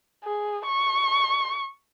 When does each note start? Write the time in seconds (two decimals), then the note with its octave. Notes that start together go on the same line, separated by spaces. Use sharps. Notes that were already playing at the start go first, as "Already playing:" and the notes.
0.24 G#4
0.66 C#6